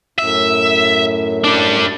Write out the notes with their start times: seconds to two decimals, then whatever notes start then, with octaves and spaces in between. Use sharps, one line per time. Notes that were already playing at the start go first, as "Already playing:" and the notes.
0.18 F#2 A2 E5
1.44 G3 D4